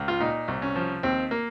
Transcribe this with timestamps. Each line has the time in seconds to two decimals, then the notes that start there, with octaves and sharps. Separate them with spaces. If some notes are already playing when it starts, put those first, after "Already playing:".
Already playing: C#2
0.08 F4
0.20 A#2 D#4
0.48 C2
0.62 C#4
0.76 F3
1.03 D#2 C4
1.31 A#3